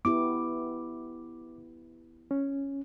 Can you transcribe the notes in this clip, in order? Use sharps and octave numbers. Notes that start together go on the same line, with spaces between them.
B3 E4 G4 D6
C#4